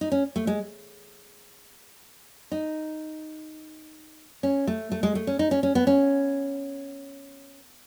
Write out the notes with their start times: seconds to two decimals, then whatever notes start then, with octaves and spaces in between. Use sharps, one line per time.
0.01 D#4
0.12 C#4
0.36 A3
0.47 G#3
2.52 D#4
4.43 C#4
4.67 A3
4.92 A3
5.03 G#3
5.15 A3
5.27 C#4
5.39 D#4
5.51 C#4
5.63 C#4
5.75 B3
5.87 C#4